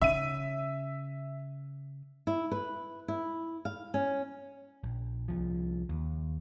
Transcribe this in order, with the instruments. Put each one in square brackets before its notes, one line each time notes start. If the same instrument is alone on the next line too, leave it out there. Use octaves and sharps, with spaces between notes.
[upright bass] C#3 [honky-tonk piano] E5 D#7
[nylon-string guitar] E4
B4
E4
F5
C#4
[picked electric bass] A#1
C2 F3
D#2